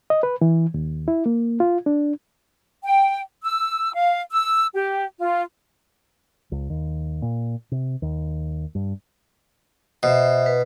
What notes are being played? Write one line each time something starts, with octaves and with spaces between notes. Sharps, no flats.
D#5
B4
E3
D#2
E4
A#3
F4
D4
G5
E6
F5
E6
G4
F4
C#2
D#2
A#2
C3
D#2
G2
B2 C5 E5
B4